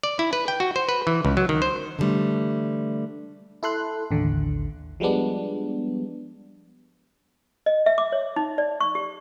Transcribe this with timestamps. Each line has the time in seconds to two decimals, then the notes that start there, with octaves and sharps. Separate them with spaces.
0.03 D5
0.19 E4
0.33 B4
0.48 G5
0.60 F#4
0.76 C5
0.89 B4
1.07 E3
1.25 C#2
1.37 F#3
1.49 D#3
1.62 C5
1.99 D3 E3 F3 G3 A3
3.63 E4 A4 C6 F#6
4.11 A1 D#2 D3
5.00 F3 G3 G#3 B3 D4
7.66 D#5
7.86 E5
7.98 D6
8.12 C#5
8.36 D#4
8.58 D5
8.81 C#6
8.95 G4